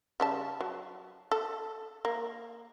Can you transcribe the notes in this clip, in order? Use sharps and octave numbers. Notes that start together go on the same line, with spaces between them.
C#3 G3 A5
F#3
A4
A#3